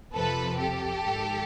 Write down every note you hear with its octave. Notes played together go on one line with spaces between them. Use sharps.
F2 C3 F3 A4 B4
G4 A4
G#2 D#3